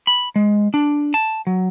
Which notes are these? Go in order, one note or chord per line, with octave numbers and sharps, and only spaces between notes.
B5
G#3
D4
A5
F#3